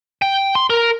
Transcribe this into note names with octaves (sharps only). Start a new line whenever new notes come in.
G5
C6
A#4